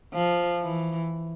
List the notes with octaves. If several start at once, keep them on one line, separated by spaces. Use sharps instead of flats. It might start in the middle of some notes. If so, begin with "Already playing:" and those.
F3
E3